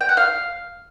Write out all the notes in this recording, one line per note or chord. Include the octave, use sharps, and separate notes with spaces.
G5
F#5
F5